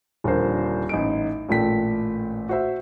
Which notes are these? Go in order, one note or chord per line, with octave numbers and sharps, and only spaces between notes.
D#1 D3 F3 A#4 C5
A1 D#4 D7
A1 A#2 A3 G5 B6
F#4 C5 E5